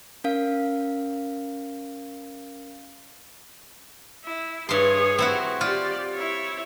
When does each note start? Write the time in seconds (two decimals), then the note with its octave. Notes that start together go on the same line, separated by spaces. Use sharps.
0.24 C#4 A#4 F5
4.24 E4
4.69 G2 G#4 C#5 C6
5.18 C4 E4 F#4
5.61 F4 G4 D5
6.14 E4 C#5